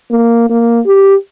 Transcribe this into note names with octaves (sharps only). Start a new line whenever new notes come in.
A#3
A#3
G4